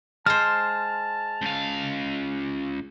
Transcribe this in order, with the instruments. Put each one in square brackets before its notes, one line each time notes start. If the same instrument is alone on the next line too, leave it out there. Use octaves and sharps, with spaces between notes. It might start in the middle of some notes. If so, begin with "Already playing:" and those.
[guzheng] G#3 C5 [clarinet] A5 [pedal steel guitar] F6
[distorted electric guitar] C#2 F5